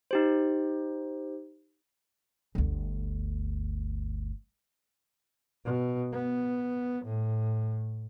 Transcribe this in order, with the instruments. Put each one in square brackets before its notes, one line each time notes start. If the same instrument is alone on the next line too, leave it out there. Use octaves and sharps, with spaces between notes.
[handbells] D#4 G4 C5
[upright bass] G1 D2
[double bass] B2
B3
A2